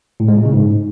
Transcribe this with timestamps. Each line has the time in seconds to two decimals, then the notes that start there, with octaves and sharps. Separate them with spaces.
0.20 A2
0.28 G#3
0.37 A#2
0.45 C#3
0.53 G#2